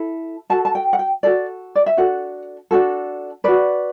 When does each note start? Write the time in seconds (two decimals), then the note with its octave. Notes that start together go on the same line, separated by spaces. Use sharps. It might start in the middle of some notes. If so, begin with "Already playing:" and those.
Already playing: E4 A4
0.50 F#4 A4 A5
0.65 A5
0.75 G5
0.93 F#5
0.99 G5
1.23 F#4 A4 D5
1.75 D5
1.86 E5
1.97 D4 F#4 A4 F#5
2.71 D4 F#4 A4
3.44 F#4 B4 D5